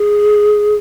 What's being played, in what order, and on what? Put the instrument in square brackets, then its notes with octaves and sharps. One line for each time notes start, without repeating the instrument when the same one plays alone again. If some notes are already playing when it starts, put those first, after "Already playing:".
Already playing: [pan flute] G#4